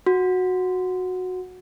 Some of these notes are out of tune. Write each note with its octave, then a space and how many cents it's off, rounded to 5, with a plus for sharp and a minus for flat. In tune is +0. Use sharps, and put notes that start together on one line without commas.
F#4 -10